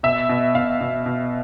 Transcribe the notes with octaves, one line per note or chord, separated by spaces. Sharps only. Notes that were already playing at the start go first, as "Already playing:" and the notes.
B2 E5
B2
B2 F5
B2
B2